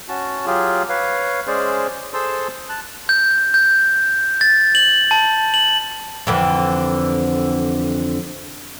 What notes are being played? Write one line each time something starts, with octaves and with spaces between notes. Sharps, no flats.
C#4 F#4 A5
F#3 F4 G4 G#4
B4 C#5 F5
G#3 C#4 G#4 C5 D5
G#4 A4 C5 A5 C6 E6
A5 F#6
G6
G6
A6
F#7
A5
F#7
F2 D3 E3